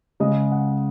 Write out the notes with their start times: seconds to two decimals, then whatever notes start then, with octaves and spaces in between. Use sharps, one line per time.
0.20 C#3 G#3 D#5
0.51 F#5